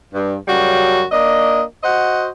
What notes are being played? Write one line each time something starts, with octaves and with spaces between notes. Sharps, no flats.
G2
F#2 C#3 G3 F#4
A#3 D4 D#5
F#4 C5 D#5 F#5